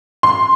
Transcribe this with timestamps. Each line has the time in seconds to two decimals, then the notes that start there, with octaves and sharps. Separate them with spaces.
0.23 C6